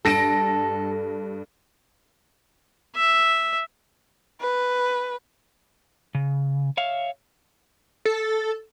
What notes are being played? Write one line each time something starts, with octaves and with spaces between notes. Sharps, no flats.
G2 A4 A#6 D7
E5
B4
C#3
C#5 E5 F5
A4